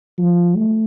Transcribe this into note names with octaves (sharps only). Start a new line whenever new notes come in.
F3
A3